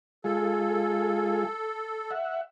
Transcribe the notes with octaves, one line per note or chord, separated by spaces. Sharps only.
G#3 F4 G#4 A4
E5 F#5